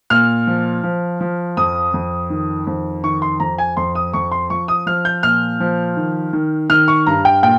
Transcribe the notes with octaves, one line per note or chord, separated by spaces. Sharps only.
A#2 F6
F3
F3
F3
F2 D#6
F2
D#3
F2
D#3 C#6
C6
F2 A#5
G#5
F2 C6
D#6
F2 C#6
C6
F3 C#6
D#6
F3 F6
G6
A#2 F6
F3
D#3
D#3
D#3 F6
C#6
G2 A#5
G5
A#2 G5